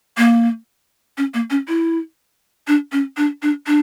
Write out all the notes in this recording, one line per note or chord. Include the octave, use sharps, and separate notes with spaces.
A#3
C#4
A#3
C#4
E4
D4
C#4
D4
D4
D4